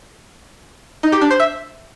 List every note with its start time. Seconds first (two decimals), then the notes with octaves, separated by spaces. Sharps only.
1.03 D#4
1.12 G4
1.21 D4
1.31 C5
1.40 E5